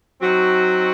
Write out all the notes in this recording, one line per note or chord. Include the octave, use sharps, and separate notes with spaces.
F#3 C4 D#4 F#4